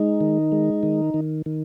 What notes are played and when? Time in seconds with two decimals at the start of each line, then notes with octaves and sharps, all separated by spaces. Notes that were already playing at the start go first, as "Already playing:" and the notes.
Already playing: G#3 D#4
0.21 D#3
0.52 G#3
0.83 D#3
1.14 D#3
1.46 D#3